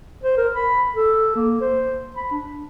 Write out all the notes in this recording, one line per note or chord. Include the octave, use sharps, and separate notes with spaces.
C5
A#4
B5
A4
A#3
C5
B5
D4